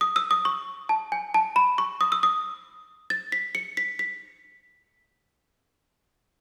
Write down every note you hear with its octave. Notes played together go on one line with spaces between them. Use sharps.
D#6
E6
D#6
C#6
A5
G#5
A5
B5
C#6
D#6
E6
D#6
A6
B6
C#7
B6
B6